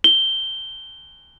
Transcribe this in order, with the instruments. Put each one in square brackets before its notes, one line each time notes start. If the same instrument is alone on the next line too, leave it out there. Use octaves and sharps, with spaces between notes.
[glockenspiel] G7